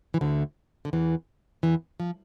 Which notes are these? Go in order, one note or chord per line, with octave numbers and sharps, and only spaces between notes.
E3
D2 D3
D3
E2 E3
E2 E3
F3